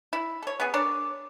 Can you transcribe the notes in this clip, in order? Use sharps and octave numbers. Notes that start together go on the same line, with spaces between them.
E4
A4 C#5
B3 C#4 G#4
D4 A#4 C#5 D5